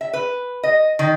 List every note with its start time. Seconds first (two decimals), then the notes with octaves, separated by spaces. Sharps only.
0.01 E5
0.13 B4
0.63 D#5
0.99 D#3